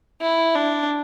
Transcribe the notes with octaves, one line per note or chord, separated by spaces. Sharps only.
E4
D4